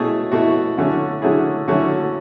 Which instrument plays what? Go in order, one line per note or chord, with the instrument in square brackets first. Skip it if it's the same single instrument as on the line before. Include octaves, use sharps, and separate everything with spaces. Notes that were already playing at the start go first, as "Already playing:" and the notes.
Already playing: [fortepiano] B2 A3 C#4 E4 G#4
B2 A3 E4 F#4
D3 F#3 A3 C#4 E4
D3 F#3 A3 C#4 E4 G#4
D3 F#3 A3 C#4 E4 F#4